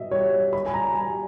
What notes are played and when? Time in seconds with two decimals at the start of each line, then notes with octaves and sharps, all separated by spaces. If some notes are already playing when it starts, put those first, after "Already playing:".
Already playing: B2 G3 D#5 E5
0.11 G3 C#5
0.53 G3 B5
0.66 G#5
0.74 A#5
0.94 G3 G#5